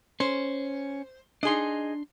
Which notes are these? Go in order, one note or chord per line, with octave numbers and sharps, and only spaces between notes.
C#4 C5
D4 D#4 G#4 D#5 C6